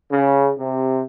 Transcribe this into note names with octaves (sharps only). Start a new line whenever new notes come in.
C#3
C3